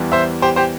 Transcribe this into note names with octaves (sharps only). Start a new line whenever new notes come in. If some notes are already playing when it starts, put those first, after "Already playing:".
Already playing: E2 E3 G3
C5 E5
G4 C5
G4 C5